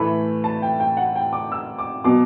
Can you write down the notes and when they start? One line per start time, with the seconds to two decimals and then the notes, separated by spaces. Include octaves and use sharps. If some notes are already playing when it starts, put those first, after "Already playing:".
Already playing: A2 E3 A3 E4 B5
0.44 A5
0.62 G5
0.80 G5
0.97 F#5
1.15 G5
1.33 D6
1.52 E6
1.78 D6
2.04 B2 F#3 D6